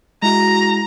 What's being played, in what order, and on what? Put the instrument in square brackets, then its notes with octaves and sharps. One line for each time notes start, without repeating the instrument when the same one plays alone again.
[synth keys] G#3 E4 F#4 [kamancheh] A#5